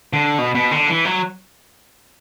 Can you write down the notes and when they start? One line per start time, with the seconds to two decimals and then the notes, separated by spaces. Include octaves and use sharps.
0.13 D3
0.38 B2
0.55 B2
0.71 D3
0.88 E3
1.05 F#3